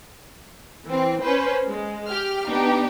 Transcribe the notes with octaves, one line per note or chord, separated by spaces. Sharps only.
E3 C4
C#4 B4 C5
G#3
G4 F6
B3 D4 D#4 G4